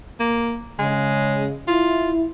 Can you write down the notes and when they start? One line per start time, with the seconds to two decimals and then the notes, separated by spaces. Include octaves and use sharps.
0.20 A#3
0.79 C#3 G#3
1.68 E4 F4